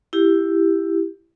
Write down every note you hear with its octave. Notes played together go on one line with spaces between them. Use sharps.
E4 G4